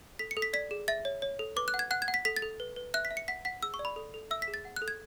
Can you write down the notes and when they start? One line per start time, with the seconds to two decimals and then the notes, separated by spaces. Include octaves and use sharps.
0.19 A4 B6
0.31 C#7
0.37 A4
0.42 B6
0.53 D5 B6
0.71 G#4
0.88 E5 A6
1.05 C#5
1.22 C#5
1.39 A4
1.56 B4 D6
1.68 F#6
1.74 F#5
1.79 G#6
1.91 F#5 F#6
2.02 G#6
2.08 F#5
2.14 B6
2.25 A4 B6
2.36 A6
2.42 A4
2.60 B4
2.76 B4
2.94 E5 F#6
3.05 B6
3.11 E5
3.17 C#7
3.28 F#5 B6
3.45 F#5 B6
3.62 G#4 E6
3.74 C#6
3.79 D5
3.85 B5
3.96 A4
4.14 A4
4.31 E5 E6
4.42 B6
4.48 G#4
4.54 A6
4.65 F#5
4.76 F#6
4.82 A4
4.88 G#6